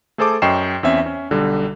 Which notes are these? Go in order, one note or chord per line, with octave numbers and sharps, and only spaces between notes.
A3 G#4 A4 C5 A5 D6
F#2 D#5 G5 C#6 C7 E7
E2 C4 C#4 E5
C#4
B1 D3 G3